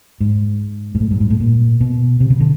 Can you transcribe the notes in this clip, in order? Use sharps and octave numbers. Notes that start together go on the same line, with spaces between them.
G#2
G#2
A2
G2
G#2
A2
A#2
B2
C3
C#3
D3